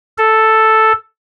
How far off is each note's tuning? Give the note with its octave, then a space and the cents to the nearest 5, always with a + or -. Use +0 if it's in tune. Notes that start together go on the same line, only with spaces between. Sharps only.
A4 +0